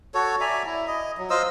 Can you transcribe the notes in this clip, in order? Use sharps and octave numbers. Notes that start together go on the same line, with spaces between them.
F#4 A4 C#5
D5 E5 G#5 A#5
E4
D#5
F#3
F4 C5 D#5 E6